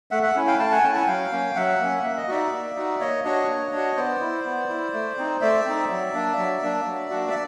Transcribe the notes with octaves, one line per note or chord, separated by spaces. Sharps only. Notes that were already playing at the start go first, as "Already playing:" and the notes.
A3 E5 F#5
E5 F#5
C#4 E4
F5 G5
A3 G5 A5
F#5 G#5
C#4 E4 G5 A5
F#5 G#5
F#3 F5 G5
A#3 C#4
F#3 E5 F#5
A#3 C#4
A#3 E5
D#5
D#4 F#4 D5 E5
A#3
D#4 F#4
A#3 C#5 D#5
D4 F#4 C#5 D#5
A#3
D4 F#4
B3 C5 D5
E4
B3
E4
A3
C4 D#4
A3 D5 E5
C4 D#4
F#3
A#3 D4
F#3
A#3 D4
F#3
A#3 D4 F#4
E5